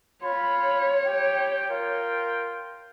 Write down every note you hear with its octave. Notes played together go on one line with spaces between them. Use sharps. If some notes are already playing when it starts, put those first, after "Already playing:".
F4 C#5 B5
G4 G5
F4 A#4 G5